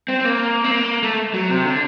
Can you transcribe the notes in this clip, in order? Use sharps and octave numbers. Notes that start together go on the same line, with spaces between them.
C4
C4
A#3
C4
A#3
A3
F#3
C3
D3